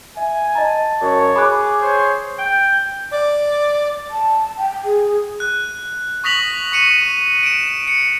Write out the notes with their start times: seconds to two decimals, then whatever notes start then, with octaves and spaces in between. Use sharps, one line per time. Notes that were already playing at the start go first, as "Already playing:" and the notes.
0.17 E5 G#5
0.55 D#5 A5 A#5
1.01 F#2 C#5
1.36 G#4 B5 D6 F#6
1.82 C5 C#5
2.39 G5
3.11 D5
4.10 A5
4.57 G5
4.84 G#4
5.40 F#6
6.24 C#6 D#6 A#6 B6 F7 F#7
6.72 C#6 C#7 D#7 E7
7.43 D7 E7
7.88 C#7